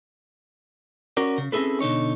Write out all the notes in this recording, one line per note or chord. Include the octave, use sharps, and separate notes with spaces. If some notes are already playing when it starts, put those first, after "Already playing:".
C#4 F#4 A#4 D5
C#3
C4 C#4 E4 G#4 A4 B4
B2 D3 D#4 C#5